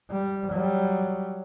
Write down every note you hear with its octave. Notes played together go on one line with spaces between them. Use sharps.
G3
F#3 G3